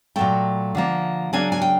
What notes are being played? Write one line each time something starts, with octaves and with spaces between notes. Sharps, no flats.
A#2 F#3 A3 G5
D3 F3 A#3
C#3 F#3 A#3 D4 G#5
G#5
G5